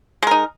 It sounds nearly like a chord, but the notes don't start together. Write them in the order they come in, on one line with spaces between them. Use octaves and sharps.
G#3 A#4 D#4